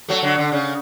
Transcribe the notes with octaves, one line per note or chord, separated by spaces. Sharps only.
F#3 A3
D3 F#3
D3
C#3